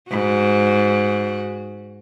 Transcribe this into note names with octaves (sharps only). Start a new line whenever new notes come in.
G#2 F#4